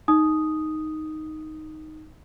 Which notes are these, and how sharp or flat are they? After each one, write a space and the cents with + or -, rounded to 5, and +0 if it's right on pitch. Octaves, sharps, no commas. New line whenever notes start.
D#4 +0 D#6 +0